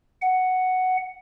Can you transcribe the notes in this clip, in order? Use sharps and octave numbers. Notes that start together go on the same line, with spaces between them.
F#5